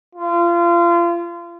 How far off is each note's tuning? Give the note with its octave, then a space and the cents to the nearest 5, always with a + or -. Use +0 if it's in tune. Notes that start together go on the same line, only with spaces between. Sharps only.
F4 -30